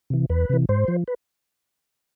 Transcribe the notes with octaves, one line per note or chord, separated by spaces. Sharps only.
C3 E3
E2 B4
C3 E3
G#2 C5
F3
B4